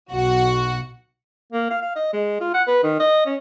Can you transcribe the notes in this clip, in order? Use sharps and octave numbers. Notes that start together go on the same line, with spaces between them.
B1 F#4 F#5
A#3
F5
F5
D#5
G#3
F4
F#5
B4
D#3
D#5
C#4